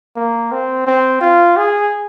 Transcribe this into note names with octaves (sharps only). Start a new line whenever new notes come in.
A#3
C4
C4
F4
G#4